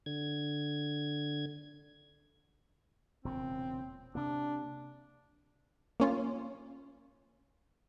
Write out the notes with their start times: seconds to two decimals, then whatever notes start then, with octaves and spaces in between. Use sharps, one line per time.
0.06 D3 G#6
3.25 E1 A#2 C#3 C4
4.15 C3 A#3 D4
6.00 A#3 C#4 F4